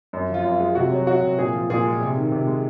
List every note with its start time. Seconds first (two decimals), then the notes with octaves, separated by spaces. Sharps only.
0.13 F#2
0.29 F3 F4
0.44 F#2
0.54 F4
0.60 G#3
0.75 C3 F#4
0.92 F#3
1.07 F#3 F#4
1.23 C3
1.38 A#2 G#4
1.53 F3
1.70 A#2 G#4
1.86 G#3
2.01 C3
2.17 D#3
2.31 C3
2.47 G#3